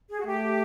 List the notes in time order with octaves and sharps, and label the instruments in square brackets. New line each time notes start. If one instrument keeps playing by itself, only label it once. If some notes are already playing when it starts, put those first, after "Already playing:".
[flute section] G#4
F#4
[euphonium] A3 [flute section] G4